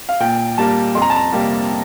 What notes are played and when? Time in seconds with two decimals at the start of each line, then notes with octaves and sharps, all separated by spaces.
0.09 F5
0.20 A#2 G5
0.58 G3 A#3 A5
0.95 F2 C6
1.02 A#5
1.10 A5
1.16 A#5
1.33 C3 G3 A#3